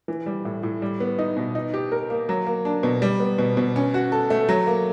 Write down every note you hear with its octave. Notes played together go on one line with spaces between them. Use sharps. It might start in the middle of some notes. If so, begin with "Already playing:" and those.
E3
G3
A2
A2
G3
B3
D#4
B2
D#4
G4
A#4
A#3
F#3
A#3
D4
B2
G3
B3
B2
B2
C#4
F#4
A4
A3
F#3
A#3